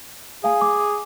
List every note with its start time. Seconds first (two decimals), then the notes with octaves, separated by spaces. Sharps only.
0.44 G#4 F5 G#5
0.61 D6